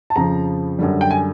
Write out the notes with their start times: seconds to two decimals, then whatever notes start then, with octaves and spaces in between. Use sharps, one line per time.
0.10 A5
0.16 F2 C#3 F3 A#5
0.79 F#2 D3 G3
1.01 G5
1.11 G#5